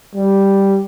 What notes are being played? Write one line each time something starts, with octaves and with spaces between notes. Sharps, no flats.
G3